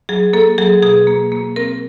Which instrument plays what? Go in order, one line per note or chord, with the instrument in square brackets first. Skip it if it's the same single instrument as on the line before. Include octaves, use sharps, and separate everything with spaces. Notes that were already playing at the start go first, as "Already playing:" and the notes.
[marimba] F#3 G#4
A#3 A4
F#3 G#4
B2 G#4
A#3
A#3
C4 A#4